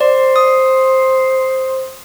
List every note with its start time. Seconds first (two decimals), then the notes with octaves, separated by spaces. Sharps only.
0.01 C5 D5
0.36 D#6